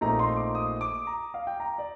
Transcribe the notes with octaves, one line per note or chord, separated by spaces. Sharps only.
A#1 A#2 A3 C4 D#4 A#5
C6
D6
D#6
D6
A#5
F5
G5
A#5
D5